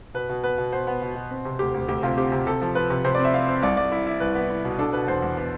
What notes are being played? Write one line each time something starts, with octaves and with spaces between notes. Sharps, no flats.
B2 B4
B2
B3 B4
B2
B3 C5
B3
B2
B2
C4
C3
D2 G4
D2
D2 G4
C3 F4
C4 G4
C3
C3 A4
F3
F3 B4
C3
C3 C5
C4 D5
E5
C4 F5
C4
C2 D5
C2 D5
E4
E4
C2 B4
B3
E4
B2
D4 A4
B2 B4
E2 C5
E2
B3